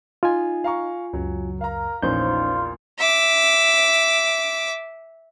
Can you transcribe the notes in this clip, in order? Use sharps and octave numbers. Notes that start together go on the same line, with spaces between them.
D#4 F4 G#5
F5 A#5 C#6
C#2 F#2 F#3
A#4 F5 A#5
A#1 E2 C#4 D#4 F4 C5 G6
E5 D6